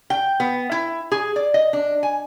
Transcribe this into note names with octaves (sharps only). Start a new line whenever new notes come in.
G5
B3
E4
G#4
D5
D#5
D4
G#5